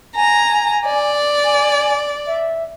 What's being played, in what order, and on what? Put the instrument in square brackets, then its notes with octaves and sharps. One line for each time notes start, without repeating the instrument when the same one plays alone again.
[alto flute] G#5 [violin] A#5
[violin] D5
[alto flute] G#5
E5